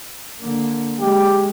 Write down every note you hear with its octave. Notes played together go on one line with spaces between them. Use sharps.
D3 A#3
G#3 G4